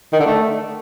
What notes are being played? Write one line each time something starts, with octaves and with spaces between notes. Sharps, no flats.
D#3
D3
A3